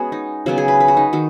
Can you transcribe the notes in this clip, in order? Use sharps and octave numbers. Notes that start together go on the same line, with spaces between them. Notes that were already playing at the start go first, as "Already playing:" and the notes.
Already playing: G#3 B3 C#4 F#4 G#4
D#4
C#3 F#3 B3 F#4
G#4
B4
B4
F#4
D#4
D#3 F#4